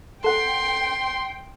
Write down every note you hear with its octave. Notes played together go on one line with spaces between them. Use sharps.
A4 F#5 G5 C6